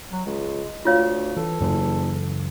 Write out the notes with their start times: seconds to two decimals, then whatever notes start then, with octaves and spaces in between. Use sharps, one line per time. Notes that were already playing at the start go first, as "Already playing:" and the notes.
0.12 F#3
0.26 C#2 G#3
0.85 D2 F4 C#5 F5
1.37 E3 A4
1.60 F#1 F#2 C#3 E3